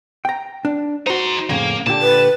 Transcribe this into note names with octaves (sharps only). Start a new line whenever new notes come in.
G5 A#5
D4
D#4 F#4 C5 C6
F2 A2 C#3 A#3
A#2 D3 G4 A5
B4